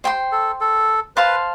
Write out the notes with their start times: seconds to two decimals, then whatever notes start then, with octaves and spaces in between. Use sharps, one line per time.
0.04 C5 G5 C6
0.32 A4
0.61 A4
1.16 B4 C5 F5 A5 C6